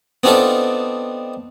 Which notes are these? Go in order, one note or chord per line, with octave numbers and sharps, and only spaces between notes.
B3 C4 D4 D#4 F4 A4